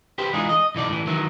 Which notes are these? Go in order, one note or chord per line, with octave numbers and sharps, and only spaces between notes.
G4 B4 C5
E3 G#3 D4 D#4 F4 G#4
D#5
B1 E3 D#4 D5
A2 E3
D#3 E3 F#3